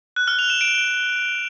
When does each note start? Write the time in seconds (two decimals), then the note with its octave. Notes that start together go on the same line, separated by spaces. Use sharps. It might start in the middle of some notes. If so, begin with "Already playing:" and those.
0.16 F#6
0.28 F6
0.39 F7
0.50 E7
0.61 D7